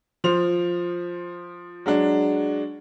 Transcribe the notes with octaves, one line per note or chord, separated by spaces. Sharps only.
F3 C5 F7
F#3 G#3 D4